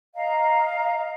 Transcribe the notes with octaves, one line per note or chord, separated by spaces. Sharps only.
D#5 F5 A#5